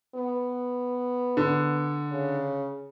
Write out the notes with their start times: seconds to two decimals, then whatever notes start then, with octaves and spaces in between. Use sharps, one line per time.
0.15 B3
1.37 D3
2.11 C#3